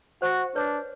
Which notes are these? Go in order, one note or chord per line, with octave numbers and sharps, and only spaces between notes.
F#4 C5
D4 B4 C#5